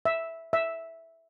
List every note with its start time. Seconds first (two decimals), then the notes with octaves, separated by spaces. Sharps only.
0.05 E5
0.53 E5